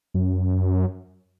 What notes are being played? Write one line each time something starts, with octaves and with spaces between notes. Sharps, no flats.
F#2